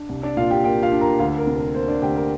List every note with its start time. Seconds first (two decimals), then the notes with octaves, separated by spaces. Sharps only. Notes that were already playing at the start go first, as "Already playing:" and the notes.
Already playing: D4
0.09 C2
0.23 D4 D5
0.37 A#2 F4 F5
0.50 G4 G5
0.64 A#3 G4 G5
0.83 F4 F5
0.92 D4
1.01 A#4 A#5
1.19 D2 F4 F5
1.38 A#4
1.47 C3
1.56 A#4
1.74 A#3 C5
1.88 D4 D5
2.02 D2 G4 G5
2.16 A#4